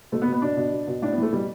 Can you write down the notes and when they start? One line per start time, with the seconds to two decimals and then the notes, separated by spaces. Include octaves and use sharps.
0.12 B2 A3
0.22 B3
0.27 B2
0.33 B3
0.42 B2 D4
0.57 B2
0.72 B2
0.87 B2
1.02 A2 D4
1.13 B3
1.18 E3 A3
1.33 B2 G3